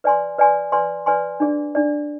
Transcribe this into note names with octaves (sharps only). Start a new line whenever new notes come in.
B4 D5 G#5 C6
B4 D5 G#5 C6
B4 D5 G#5 C6
B4 D5 G#5 C6
D4 G#4 D5
D4 G#4 D5